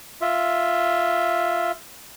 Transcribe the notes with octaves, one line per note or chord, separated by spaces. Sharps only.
F4 E5